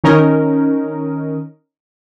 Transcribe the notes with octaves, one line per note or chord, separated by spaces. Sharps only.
D#3 C#4 D#4 A#4 D#5